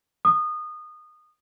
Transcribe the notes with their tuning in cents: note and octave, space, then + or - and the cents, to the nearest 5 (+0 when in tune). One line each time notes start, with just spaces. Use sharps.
D#6 -25